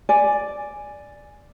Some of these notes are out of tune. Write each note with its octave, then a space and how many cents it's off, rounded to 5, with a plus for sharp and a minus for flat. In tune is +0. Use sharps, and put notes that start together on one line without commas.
D5 +0 G#5 +0